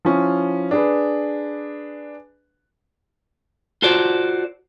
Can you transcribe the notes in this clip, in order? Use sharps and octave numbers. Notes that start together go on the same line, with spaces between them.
F3 C#4 E4
D4 G#4 B4
F4 F#4 A4 C5 D5